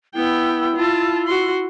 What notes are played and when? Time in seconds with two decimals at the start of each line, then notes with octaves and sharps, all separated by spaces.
0.15 B3 E4 G5
0.75 F4 A5
1.27 F#4 C6